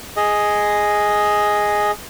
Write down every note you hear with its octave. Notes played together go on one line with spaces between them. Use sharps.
G#4 D#5